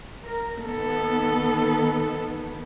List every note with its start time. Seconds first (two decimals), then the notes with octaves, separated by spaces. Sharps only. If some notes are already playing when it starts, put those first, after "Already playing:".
0.25 A#4
0.66 D#3 B3 A4